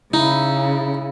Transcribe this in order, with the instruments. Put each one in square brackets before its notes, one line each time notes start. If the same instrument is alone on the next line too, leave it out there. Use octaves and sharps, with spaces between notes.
[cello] C#3 [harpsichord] D#4 [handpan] E4